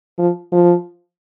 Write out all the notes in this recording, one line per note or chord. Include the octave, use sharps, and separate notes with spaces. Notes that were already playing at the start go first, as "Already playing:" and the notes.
F3
F3